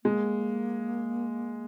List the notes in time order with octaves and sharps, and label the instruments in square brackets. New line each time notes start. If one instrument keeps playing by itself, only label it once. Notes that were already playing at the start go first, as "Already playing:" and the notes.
[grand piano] G#3 [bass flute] A#3